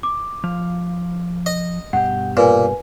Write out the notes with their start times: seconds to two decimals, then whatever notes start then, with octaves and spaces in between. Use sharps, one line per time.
0.03 D6
0.44 F3 F5
1.46 D#5
1.93 G2 B2 G4 F#5
2.37 A#2 B4 G#5